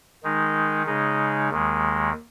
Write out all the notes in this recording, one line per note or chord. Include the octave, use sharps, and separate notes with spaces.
D#3 G#3 D#4
C#3 G#3 D#4
D#2 D#3 G#3